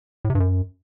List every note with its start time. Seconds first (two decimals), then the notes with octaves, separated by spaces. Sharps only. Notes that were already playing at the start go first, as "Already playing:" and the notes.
0.25 A2
0.30 C3
0.35 G2
0.40 F#2